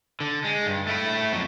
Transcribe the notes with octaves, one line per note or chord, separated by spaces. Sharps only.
D3
G#3
G2
A3 E4
F2 F#3